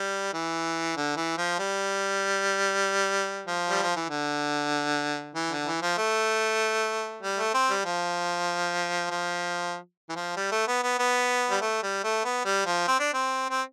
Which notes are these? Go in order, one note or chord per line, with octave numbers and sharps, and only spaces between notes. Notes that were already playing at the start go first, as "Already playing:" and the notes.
Already playing: G3
E3
D3
E3
F3
G3
F3
G3
F3
E3
D3
E3
D3
E3
F3
A3
G3
A3
C4
G3
F3
F3
E3
F3
G3
A3
B3
B3
B3
G3
A3
G3
A3
B3
G3
F3
C4
D4
C4
C4